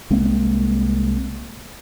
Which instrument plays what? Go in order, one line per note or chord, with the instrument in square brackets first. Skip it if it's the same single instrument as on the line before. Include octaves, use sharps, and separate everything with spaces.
[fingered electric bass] C2 G#3 A#3 C4